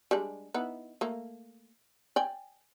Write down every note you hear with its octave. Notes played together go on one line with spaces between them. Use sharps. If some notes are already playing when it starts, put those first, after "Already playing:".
G3 G#3 D4
B3 D#4 E4
A3 A#3
D5 G5 G#5